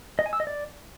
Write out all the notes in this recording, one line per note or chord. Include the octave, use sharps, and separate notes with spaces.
D#5
G#5
E6
D#5
D5